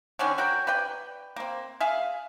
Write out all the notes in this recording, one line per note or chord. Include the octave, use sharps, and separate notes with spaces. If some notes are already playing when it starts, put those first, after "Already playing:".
D3 D#3 F#3 C#4
F#3 F#4 A#4 G5
B4 D5 G5
A#3 C4
G#4 E5 F5